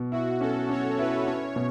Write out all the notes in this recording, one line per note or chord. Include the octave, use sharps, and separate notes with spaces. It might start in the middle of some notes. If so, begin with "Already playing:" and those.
Already playing: B2
E4 F#4
C#4 A4
C#4 C#5
E4 B4
C#4 C#5
B2